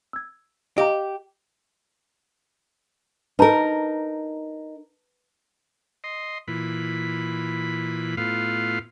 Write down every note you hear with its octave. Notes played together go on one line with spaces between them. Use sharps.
E6 G#6
G4 D#5 F5 A#5
D#4 A#4 B4 A5 A#5
D#5 C6
A#2 E3 B5
A2 B3 F4 F5